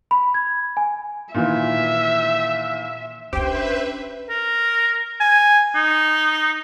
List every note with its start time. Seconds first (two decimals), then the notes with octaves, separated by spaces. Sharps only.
0.11 B5
0.34 G#6
0.77 G#5
1.34 A#2 D#3 E3 E5
3.33 C#4 D4 G4 B4 C5 E5 G5
4.30 A#4
5.20 G#5
5.75 D#4